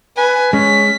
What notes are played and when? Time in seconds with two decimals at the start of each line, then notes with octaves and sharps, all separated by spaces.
0.17 B4 G#5
0.53 G#3 C#4 B6